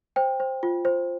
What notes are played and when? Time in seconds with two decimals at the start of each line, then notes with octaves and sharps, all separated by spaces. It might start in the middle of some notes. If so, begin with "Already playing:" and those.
0.16 C5 G5
0.40 C5
0.63 F4
0.85 C5